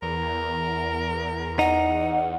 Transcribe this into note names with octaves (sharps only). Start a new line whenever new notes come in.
E2 A#4
D#4 F#5